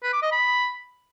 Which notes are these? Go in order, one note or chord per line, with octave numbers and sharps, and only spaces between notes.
B4
D6
D#5
B5